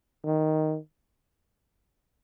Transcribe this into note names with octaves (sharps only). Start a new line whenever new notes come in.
D#3